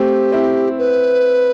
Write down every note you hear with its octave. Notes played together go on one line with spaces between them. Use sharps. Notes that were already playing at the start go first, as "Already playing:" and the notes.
Already playing: A3 C4 G4
C4 E4
B4